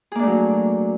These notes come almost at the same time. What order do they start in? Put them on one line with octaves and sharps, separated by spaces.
G#4 A#3 D4 A3 F#3